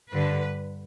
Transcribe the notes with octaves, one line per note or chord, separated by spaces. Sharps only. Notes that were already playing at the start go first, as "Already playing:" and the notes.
G2 D3 B4